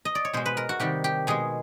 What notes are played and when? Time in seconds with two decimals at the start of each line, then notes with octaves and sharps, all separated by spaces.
0.05 D#5
0.15 D5
0.25 C#5
0.33 B2 G#3 C5
0.46 B4
0.57 A#4
0.69 F#4
0.80 C3 D#3 G3 G4
1.04 G4
1.27 B2 G#3 G#4